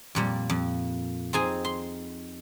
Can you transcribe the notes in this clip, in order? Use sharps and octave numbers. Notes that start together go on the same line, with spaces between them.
F2 A#2 G3
F2
C4 D#4 G#4 G#5
C6